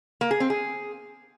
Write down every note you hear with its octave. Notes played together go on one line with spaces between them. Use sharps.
A#3
G#4
C4
G#4